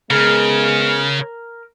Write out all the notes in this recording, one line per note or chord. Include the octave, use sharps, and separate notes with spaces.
C#3 G#3 B3 G#4 A#4